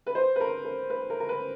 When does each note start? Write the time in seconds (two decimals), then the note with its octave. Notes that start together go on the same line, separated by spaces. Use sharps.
0.06 B4
0.15 C5
0.36 B4
0.40 A#4
0.65 A#4
0.90 B4
1.10 A#4
1.20 A#4
1.29 B4